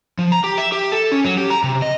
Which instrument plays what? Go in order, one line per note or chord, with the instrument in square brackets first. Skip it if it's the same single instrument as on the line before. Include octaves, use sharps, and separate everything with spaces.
[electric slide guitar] F3
A#5
G4
E5
G4
A4
C#4
F#3
G4
A#5
C3
D#5